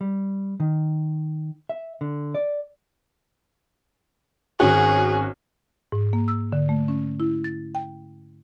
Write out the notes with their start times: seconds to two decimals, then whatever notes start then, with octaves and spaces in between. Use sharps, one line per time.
0.01 G3
0.60 D#3
1.69 E5
2.01 D3
2.35 D5
4.60 G#1 C#4 F#4 G#4
5.92 G#2
6.13 A#3
6.28 E6
6.52 D3
6.69 A3
6.88 C#4
7.20 E4
7.44 A6
7.75 G5